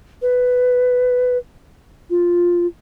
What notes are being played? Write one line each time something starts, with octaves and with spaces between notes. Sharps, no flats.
B4
F4